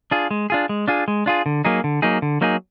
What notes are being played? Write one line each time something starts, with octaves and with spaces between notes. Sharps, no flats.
D4 F4 G#4
G#3
D4 F4 G#4
G#3
D4 F4 G#4
G#3
D4 F4 G#4
D3
F#3 A#3 D#4 G#4
D3
F#3 A#3 D#4 G#4
D3
F#3 A#3 D#4 G#4